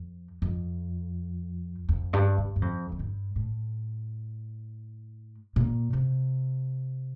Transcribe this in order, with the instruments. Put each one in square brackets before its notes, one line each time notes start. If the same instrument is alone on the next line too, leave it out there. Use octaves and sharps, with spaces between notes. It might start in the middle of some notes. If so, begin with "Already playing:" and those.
Already playing: [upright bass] F2
F2
F2
G2
G2
G2
F2
F2
G2
A2
A#2
C3